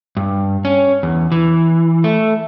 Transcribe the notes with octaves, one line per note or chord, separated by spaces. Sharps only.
G2
C#4
E2
E3
A3